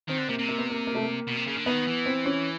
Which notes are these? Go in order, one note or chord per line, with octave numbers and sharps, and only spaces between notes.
D#3 C4
D3
C3 A#3
C3
A#3
B3
A#3
A#3
A3
A#3
B2
C3
C#3
D3
D#3 B3
E3
C4
C#4